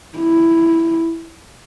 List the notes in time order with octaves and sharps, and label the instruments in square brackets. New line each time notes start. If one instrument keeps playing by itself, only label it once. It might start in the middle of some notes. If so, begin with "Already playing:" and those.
[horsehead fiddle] E4